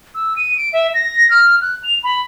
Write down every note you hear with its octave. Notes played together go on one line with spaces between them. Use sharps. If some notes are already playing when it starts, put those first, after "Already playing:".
E6
D#7
D7
E5
A#6
F6
F#6
F7
B5